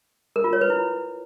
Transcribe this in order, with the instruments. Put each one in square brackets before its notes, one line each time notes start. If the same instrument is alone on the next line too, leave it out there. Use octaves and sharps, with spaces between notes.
[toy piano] A#4
F4
C#5
B4
E4